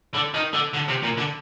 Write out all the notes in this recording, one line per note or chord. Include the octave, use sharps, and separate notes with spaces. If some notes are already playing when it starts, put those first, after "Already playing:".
D3
D#3
D3
D3
C3
A#2
D3